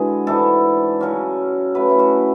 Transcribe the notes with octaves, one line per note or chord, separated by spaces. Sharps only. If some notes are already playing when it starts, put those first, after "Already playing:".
Already playing: D3 G#3 B3 E4 F#4 G#4
G#2 E3 B3 D4 A4
C#3 F#3 C#4
C#3 F#3 A3 B4
E4
F#4